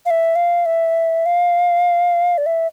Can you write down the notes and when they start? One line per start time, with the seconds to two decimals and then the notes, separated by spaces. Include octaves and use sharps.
0.06 F5
0.10 E5
0.35 F5
0.66 E5
1.26 F5
2.38 D5
2.46 E5